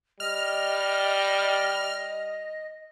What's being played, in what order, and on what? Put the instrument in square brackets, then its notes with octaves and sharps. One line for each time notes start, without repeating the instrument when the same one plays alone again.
[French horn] G3 [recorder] D#5 [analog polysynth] F6